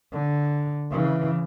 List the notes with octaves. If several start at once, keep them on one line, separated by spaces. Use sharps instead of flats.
D3
C#3 E3